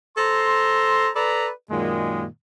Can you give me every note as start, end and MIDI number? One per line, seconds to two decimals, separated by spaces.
0.16 1.08 69
0.16 1.08 72
0.16 1.08 82
0.16 1.08 84
1.15 1.48 69
1.15 1.48 71
1.15 1.48 74
1.15 1.48 82
1.15 1.48 83
1.70 2.24 42
1.70 2.24 46
1.70 2.24 51
1.70 2.24 56